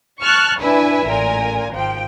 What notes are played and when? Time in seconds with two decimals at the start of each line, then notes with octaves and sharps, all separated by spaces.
0.22 A5 C#6 F6 F#6
0.61 D4 E4 B4 E5 G#5
1.09 A1 A#2 A#4 G#5
1.73 G#1 F3 G5